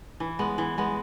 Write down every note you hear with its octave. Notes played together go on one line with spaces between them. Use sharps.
E3
G#3 B3
E3
G#3 B3